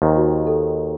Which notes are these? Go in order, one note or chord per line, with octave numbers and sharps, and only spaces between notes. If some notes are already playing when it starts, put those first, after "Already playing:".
D#2 D#3 C5
F#4
F#4
A4